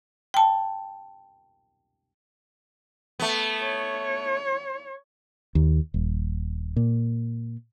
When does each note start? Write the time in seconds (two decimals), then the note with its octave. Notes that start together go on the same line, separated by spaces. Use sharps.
0.34 G5 A5
3.20 A3 B3
3.62 C#5
5.55 D#2
5.94 D#1
6.76 A#2